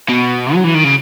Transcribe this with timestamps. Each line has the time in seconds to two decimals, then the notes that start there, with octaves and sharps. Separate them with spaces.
0.09 B2
0.54 F#3
0.64 E3
0.74 D#3
0.84 C#3